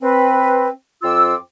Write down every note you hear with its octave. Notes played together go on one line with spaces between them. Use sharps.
C4 B4
F2 C4 F4 D6 E6